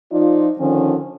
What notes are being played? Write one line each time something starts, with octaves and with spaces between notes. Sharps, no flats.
F3 D#4 F4 D5
D3 D#3 F3 C#4